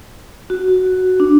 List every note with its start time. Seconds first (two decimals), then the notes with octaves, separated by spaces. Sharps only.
0.50 F#4
1.20 D4